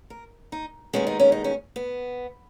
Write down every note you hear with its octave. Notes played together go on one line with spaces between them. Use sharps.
A#4
D#4
D#2 D#3 G#3 B3 C#4
D#4
C#4
D#4
C#4
B3